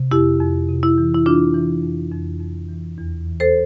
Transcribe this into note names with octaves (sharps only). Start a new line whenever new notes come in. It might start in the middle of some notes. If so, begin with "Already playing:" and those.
Already playing: C3
F2 E4 G4
F2
C3
E4
E3
E4
E3 D4 F4
E3
F2
F2
F2
E3
E2
E3
A4 C5